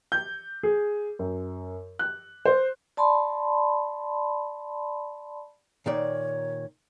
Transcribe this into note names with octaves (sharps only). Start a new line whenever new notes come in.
G6
G#4
F#2
F#6
C5
D5 A5 B5 C6
A#2 D#3 C#5 D5